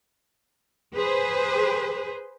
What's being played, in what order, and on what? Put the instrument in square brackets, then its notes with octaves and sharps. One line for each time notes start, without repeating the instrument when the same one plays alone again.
[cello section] G#4 B4 C5